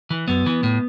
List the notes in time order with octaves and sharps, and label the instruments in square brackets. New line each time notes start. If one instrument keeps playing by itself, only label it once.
[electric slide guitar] E3
F#2 B3
E3
A2